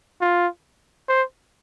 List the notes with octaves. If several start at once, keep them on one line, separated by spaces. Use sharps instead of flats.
F4
C5